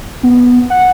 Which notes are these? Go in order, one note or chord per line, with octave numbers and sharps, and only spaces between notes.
B3
F#5